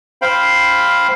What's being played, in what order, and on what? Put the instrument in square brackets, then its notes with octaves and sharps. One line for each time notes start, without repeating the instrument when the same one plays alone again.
[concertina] C5 F5 G5 B5